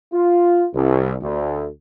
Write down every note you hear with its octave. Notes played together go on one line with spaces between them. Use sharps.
F4
C2
D2